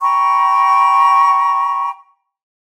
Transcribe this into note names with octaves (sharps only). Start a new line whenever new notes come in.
G5 A#5 B5 C#6